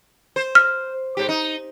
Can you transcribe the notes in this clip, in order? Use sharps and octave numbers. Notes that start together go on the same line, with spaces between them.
C5
F6
G#2 G4
D#4